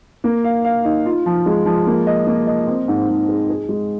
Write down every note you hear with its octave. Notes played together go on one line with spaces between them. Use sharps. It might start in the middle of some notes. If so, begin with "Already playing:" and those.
A#3
F5
F5
D#4
F4
F3
G#3
F3
A#3
D#5
A#3
D#5
C4
G#2
G#2
G#4
G#4
G#3